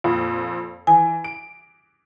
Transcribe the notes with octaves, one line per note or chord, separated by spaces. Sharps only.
F2 A#2 F4
E3 G#5
D7